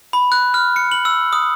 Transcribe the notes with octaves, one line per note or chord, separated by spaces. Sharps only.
B5
F#6
F6
C#7
F#7
E6
D#6